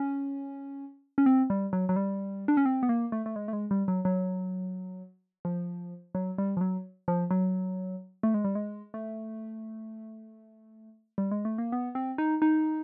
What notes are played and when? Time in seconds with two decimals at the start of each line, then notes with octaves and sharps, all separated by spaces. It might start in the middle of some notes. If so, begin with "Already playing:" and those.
Already playing: C#4
1.18 C#4
1.26 C4
1.50 G3
1.73 F#3
1.89 F#3
1.96 G3
2.48 D4
2.57 C#4
2.66 C4
2.83 B3
2.89 A#3
3.12 A3
3.26 A3
3.36 G#3
3.48 A3
3.53 G#3
3.71 G3
3.88 F#3
4.05 F#3
5.45 F3
6.15 F#3
6.38 G3
6.57 F3
6.61 F#3
7.08 F3
7.31 F#3
8.23 A3
8.34 G#3
8.44 G3
8.55 G#3
8.94 A3
11.18 G3
11.31 G#3
11.45 A3
11.58 A#3
11.72 B3
11.95 C4
12.18 D#4
12.42 D#4